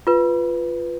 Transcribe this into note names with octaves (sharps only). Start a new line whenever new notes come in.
F4 B4